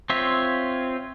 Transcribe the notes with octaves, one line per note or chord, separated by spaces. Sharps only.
C4 F4 C#5 E5